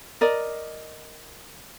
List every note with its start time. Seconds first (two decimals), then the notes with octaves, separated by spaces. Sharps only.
0.21 A#4 D5 D#5